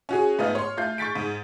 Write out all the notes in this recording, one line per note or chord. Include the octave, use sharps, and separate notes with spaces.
C#4 F#4 G#4
G#2 A3 B3 F4 D#5 F6
C#5 C6
A3 F4 G6 C7
C#6 G6 A6 B6 D7
G#2